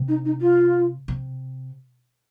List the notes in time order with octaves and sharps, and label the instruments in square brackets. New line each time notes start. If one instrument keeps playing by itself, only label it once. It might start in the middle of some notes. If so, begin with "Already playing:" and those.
Already playing: [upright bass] C3
[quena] D#4
D#4
F4
[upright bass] C3